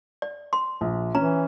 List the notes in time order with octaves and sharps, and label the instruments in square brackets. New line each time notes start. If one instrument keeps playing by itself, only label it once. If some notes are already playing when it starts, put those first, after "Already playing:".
[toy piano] D5
C6
[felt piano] A#1
[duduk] E3 [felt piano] C#4 [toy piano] A#5